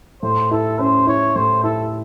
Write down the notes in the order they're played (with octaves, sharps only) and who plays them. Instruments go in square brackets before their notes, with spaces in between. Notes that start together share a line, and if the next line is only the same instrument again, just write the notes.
[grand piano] A2 [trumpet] C5
[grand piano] E4 [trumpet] A4
[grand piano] C#4 [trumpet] C5
[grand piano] E4 [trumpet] C#5
[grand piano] A2 [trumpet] C5
[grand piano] E4 [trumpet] A4